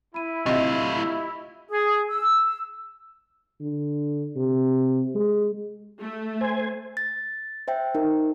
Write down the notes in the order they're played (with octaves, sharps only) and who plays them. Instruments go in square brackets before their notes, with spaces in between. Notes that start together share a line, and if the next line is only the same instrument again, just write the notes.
[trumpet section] E4 [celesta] B5 D#7
[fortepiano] C3 [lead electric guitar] A3 F5 [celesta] F4 G4 D#5
[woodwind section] G#4
E6
[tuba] D3
C3
G#3
[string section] A3
[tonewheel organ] C5 G#5
[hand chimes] A6
C5 E5 G5
D#4 A#4